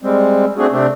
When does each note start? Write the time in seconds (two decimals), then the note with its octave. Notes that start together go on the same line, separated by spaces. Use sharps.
0.02 G3 G#3 C4
0.57 A3 C4 D4 F#4 G#4
0.71 C3 A3 C4 D4